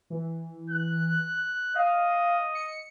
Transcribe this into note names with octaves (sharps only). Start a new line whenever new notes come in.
E3
F#6
D#5 F5
C#7